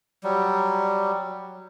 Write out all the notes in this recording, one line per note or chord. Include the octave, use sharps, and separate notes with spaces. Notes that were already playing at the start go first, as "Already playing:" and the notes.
F#3 G3